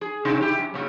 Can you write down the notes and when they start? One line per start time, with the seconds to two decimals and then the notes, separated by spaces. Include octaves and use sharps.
0.01 G#4
0.25 C3 D#4
0.41 E4 G4
0.59 F#2
0.74 A#2 C#3